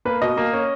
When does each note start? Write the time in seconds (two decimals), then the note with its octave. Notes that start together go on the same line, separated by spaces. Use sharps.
0.05 A#3 B4
0.22 B2 D#5
0.37 A#3
0.53 C#4